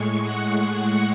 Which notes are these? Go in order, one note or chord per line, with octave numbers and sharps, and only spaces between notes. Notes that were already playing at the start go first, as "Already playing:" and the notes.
Already playing: A2 G#3 C#6
F#5